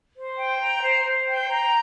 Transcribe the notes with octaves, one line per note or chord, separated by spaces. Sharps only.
C5
G5
A#5
C5
C5
G5
A#5